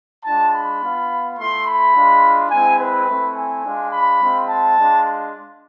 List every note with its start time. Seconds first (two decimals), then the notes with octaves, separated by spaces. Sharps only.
0.24 G#3 D4 F4 A5
0.52 B5
0.81 B3 F4
1.37 A3 E4 C6
1.66 B5
1.94 G#3 D4 F4
2.50 G#3 C4 E4 G#5
2.79 B4
3.07 A3 C4 E4
3.35 G#5
3.64 G#3 D4 F4
3.91 B5
4.21 G#3 C4 F4
4.49 A5
4.77 G#3 D4 F4